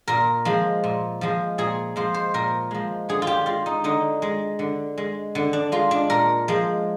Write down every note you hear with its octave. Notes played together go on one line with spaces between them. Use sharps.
A#2 A#4
F3 G#3
A#2
F3 G#3
A#2 G#4
F3 G#3 C5
C5
A#2 A#4
F3 G#3
D3 G#4
F4
G4
G#3 F4
D#4
D3 D#4
G#3
D3
G#3
D3
D4
G#3 F4
D4
A#2 A#4
F3 G#3